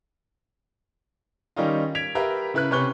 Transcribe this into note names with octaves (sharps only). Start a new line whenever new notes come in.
D#3 G3 C#4 D#4 F4
G#6 B6 D7 F7
G4 A#4 B4 E5 F5
C#3 E4 B4 B5 F#6
C3 C#4 B4 C#6 F#6 G7